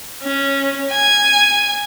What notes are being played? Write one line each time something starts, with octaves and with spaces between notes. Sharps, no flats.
C#4
G#5